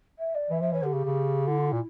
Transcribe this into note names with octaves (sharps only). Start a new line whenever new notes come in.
E5
D5
E3 E5
F3 E5
E3 C#5
D3 G4
C#3
C#3
D3 E4
F4
E4
A#2